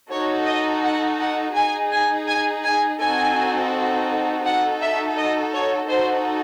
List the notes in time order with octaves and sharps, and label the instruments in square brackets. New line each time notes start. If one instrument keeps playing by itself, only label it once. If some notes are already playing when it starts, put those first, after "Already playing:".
[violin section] D#4 F#4 A4 C#5
D#5
F#5
F#5
D#4 G#4 G#5
G#5
G#5
G#5
C4 D#4 F#4 A4 G#5
D#4 F#4 A4 F#5
E5
D#5
C#5
D#4 F#4 A4 C5